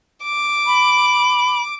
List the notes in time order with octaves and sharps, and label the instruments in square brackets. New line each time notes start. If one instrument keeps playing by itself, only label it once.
[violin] D6
[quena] B5